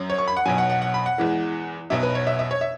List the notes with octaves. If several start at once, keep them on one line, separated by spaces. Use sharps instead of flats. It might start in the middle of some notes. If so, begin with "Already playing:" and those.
Already playing: F#2 F#3
C#5
C#6
B5
F#5
B1 B2 F#3 G#5
F#5
F#5
F#5
B5
F#5
E2 E3 G#3
B1 B2 F#3 E5
B4
C#5
E5
E5
C#5
E5